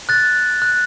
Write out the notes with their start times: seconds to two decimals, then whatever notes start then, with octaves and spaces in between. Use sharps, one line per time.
0.09 F#6 A6
0.62 F#6